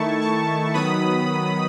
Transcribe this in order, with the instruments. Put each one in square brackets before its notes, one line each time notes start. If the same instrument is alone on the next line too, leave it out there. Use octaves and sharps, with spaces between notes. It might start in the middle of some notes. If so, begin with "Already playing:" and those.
Already playing: [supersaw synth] D#3 A3 E4 A5 C#6
A5 C#6
D#3 F#3 B3 B5 D#6